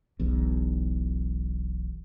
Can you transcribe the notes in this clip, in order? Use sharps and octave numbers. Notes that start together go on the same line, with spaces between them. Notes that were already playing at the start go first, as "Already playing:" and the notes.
E1 B1 E2